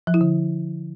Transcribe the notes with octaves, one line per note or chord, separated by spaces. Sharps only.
F3
E4
D3